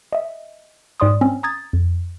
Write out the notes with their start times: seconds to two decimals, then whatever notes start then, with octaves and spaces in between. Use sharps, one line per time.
0.13 D#5 E5
1.00 G#2 D5 C6 D#6
1.21 C4 C#4
1.43 A#5 D#6 G#6 A6
1.73 F2